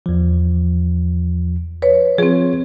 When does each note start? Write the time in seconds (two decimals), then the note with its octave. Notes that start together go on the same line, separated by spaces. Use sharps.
0.06 E2 F3
1.82 B4 C#5
2.18 F3 C4 F4 G#4 C#5